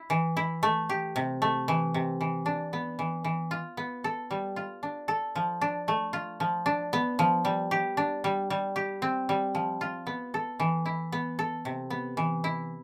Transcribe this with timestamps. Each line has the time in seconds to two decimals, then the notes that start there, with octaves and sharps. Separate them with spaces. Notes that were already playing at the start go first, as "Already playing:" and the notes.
Already playing: E4
0.10 E3
0.37 E4
0.63 A3
0.89 G4
1.16 C3
1.42 A3
1.68 E3
1.94 C3
2.21 E3
2.46 D4
2.73 B3
2.99 E3
3.24 E3
3.51 F4
3.77 B3
4.04 A4
4.31 G3
4.56 F4
4.83 D4
5.08 A4
5.36 F3
5.61 D4
5.88 A3
6.13 F4
6.40 F3
6.66 D4
6.93 B3
7.19 F3
7.45 G3
7.71 G4
7.97 D4
8.24 G3
8.50 G3
8.76 G4
9.02 C4
9.29 G3
9.55 F3
9.81 F4
10.07 B3
10.34 A4
10.60 E3
10.86 E4
11.12 B3
11.39 A4
11.65 C3
11.90 B3
12.17 E3
12.44 E4